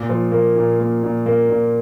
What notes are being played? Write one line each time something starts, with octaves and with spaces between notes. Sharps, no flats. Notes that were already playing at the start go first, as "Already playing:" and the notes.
Already playing: A#2
F3
A#3
A#2
A#3
A#2
A#3
A#2